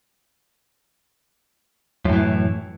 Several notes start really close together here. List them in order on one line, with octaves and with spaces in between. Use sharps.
F#2 A2 E3